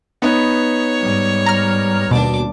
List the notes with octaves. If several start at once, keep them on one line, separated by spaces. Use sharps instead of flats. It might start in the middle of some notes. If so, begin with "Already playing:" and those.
B3 D#4 B4 C#5
G#2 G3
A#5 F6
D#2 B2 G3 D4 D6